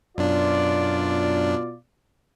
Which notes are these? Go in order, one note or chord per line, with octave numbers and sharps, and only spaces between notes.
F#2 B2 D4 F4 D5